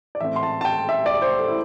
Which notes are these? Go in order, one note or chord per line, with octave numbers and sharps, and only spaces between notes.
D5
A2 E3 A3 C4 E5
C6
A5
A5
G5
E5
D5
C5
A4
E4